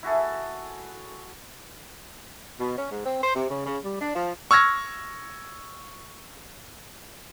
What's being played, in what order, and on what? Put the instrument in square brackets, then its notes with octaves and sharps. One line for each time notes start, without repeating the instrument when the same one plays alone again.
[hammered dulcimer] E4 F#4 G#4 A4
[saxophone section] B2
C#4
G#2
C4
C5
C3
C#3
C#3
G3
D4
F3
[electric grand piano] C#6 E6 F6 G#6 A#6